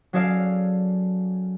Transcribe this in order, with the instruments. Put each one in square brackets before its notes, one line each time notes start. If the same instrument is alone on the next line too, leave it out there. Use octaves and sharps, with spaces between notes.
[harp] F#3 C#4 G#4 A4 D5 F5